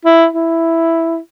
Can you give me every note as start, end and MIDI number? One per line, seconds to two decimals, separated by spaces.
0.05 0.27 64
0.33 1.18 64